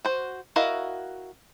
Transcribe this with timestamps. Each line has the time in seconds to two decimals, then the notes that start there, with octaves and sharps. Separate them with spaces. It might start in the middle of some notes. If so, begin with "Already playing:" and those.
0.05 F#4 C5
0.56 E4 F#4 A#4 D#5 F5